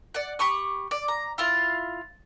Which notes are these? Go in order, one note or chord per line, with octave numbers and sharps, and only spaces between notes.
D5 F#5
G4 B5 C#6 D#6
D5
A#5
E4 F4 F5